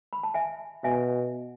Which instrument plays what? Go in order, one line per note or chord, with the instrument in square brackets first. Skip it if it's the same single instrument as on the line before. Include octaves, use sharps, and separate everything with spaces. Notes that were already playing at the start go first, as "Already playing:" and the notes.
[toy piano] B5
A5
E5 G#5
[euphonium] B2 [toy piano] E5 G#5